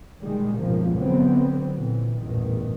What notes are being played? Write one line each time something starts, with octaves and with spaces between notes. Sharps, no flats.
A#2 D#3 G3 G#3
G#1 C#2 F#2 B2 F3 A#3
D3 F#3 B3 C4
A#2 E3
A1 E2 G2 A#2 D#3